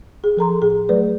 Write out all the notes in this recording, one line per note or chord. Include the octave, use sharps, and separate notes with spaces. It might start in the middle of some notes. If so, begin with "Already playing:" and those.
G#4
F3 A4 A#5 C6
A2 G#4
F#3 A3 B4 D5